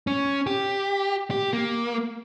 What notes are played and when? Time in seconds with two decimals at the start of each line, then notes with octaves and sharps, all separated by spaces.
0.07 C#4
0.47 G4
1.31 G4
1.53 A#3